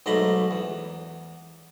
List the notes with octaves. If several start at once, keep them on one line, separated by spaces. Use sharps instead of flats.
B1 G#2 A3 A#5 B5
E2